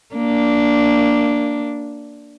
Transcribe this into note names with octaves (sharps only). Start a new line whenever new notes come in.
A#3 D4